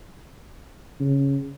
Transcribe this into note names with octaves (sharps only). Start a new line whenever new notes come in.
C#3